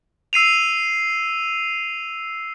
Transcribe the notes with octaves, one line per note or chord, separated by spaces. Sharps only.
E6 C7 D#7 F7